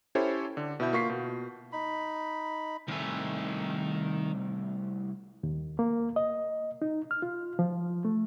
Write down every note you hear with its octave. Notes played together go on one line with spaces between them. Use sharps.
C#4 E4 G4 A4 C5 C#5
D3
B2 E4 E5 G6
A#3 F4 C#6 B6 C7
B2
D#4 B5
C2 D#3 A3 G#5
D#2
A#3
D#5
D#4
F6
F4
F3
A3